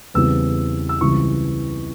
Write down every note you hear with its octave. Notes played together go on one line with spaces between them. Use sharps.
E2 C#3 G3 C4 E4 E6
E6
C#2 C#3 E3 G3 C4 C#6